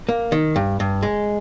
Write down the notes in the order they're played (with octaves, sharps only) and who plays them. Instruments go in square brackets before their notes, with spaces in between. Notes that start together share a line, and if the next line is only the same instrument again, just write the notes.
[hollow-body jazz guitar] A#3
D#3
G2
G2
G#3